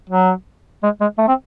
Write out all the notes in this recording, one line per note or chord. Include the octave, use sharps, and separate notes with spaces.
F#3
G#3
G#3
A3
C4